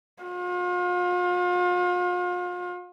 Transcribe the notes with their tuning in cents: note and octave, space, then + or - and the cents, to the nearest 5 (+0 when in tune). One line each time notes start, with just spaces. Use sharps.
F4 +40